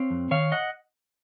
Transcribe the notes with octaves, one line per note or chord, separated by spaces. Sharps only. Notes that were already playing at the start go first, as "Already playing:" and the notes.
Already playing: C4 C#5 F5
F2
D#3 C#5 F5
D#5 F#5